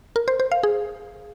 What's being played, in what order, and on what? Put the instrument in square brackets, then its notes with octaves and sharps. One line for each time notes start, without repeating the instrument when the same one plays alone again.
[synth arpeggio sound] A#4
C5
C5
F5
G#4